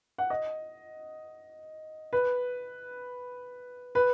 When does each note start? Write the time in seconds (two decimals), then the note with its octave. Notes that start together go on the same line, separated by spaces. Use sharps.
0.18 F#5
0.30 D#5
2.13 B4
3.95 B4